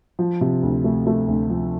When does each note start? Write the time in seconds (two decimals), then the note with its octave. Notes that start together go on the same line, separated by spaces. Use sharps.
0.19 F3
0.41 C3
0.63 D2
0.84 A3
1.07 A3
1.28 D2
1.50 F3